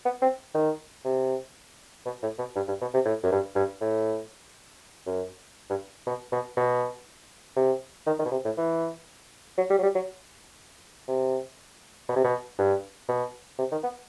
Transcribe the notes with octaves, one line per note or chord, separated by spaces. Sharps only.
B3
C4
D#3
C3
B2
A2
B2
G2
G2
B2
C3
A2
F#2
G2
G2
A2
F#2
G2
B2
B2
B2
C3
D#3
D#3
B2
C3
A2
E3
F#3
G3
F#3
G3
F#3
C3
B2
C3
B2
G2
B2
C3
D#3
B3